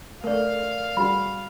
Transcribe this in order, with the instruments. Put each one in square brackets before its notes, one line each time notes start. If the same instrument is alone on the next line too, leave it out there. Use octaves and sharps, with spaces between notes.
[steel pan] A3 [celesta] A#4 D5 [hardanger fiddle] F5
[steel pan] G3 F#4 G#4 [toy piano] B5